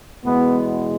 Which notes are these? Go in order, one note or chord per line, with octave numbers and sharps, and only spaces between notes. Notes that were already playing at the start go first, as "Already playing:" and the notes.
E2 B2 G#3 B3